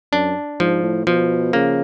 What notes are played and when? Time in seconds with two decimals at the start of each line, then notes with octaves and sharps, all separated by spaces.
0.12 F#2 D4
0.60 G#2 F3
0.83 A2
1.07 B2 F3
1.53 C#3 A#3